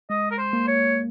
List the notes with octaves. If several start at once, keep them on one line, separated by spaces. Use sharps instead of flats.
G#3 D#5
A#4
C5
A#3
C#5